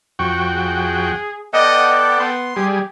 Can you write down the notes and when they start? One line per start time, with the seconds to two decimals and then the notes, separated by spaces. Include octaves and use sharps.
0.19 F2 F#4 G5 C#6
0.55 G#4
1.53 B3 A4 D5 D#5 F#5 G5
2.19 B3 C6
2.56 G3 G4 G#4